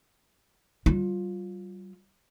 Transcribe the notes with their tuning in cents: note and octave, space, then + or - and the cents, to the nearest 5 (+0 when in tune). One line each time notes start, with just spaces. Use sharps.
G3 -40 F4 +15